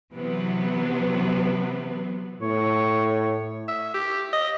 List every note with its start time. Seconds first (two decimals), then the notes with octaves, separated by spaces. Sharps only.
0.14 C3 E3 F#3 B3
2.42 A2 C#5
3.68 E5
3.94 G4
4.33 D#5